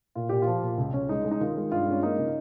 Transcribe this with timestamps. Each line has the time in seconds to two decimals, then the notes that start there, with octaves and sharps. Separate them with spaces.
0.15 A#2 F4
0.29 A#2 G4
0.42 F3 F4
0.62 A#2
0.78 C#2
0.93 C#2 C#4
1.09 G#3 D#4
1.25 G#3
1.31 D#4
1.41 D#3 F4
1.56 G#3
1.72 G2 F4
1.87 G#3 C#4
2.03 A#3 D#4
2.18 C#3